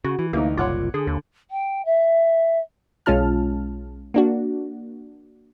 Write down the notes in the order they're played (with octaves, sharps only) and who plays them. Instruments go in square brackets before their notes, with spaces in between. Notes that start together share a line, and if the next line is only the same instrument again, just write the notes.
[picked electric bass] C#3 [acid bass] F#4
[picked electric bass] E3
[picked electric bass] D2 [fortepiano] E3 D#4 [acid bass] A#3
[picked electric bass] F#1 C2 A#2 [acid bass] F4 [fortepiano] C#5 F#5 D6
[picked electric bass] D3 [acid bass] G#4
[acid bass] D#2
[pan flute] G5
E5
[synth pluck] B1 G#3 C#4 F4 A5 F6
A#3 D4 F#4